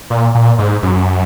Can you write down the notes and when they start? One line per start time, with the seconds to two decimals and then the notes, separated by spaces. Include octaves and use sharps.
0.10 A#2
0.35 A#2
0.58 G#2
0.83 F#2